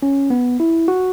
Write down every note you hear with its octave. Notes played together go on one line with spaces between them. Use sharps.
C#4
B3
E4
F#4